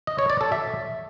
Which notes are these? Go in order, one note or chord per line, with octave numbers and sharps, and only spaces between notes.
D#5
C#5
D5
A4
E5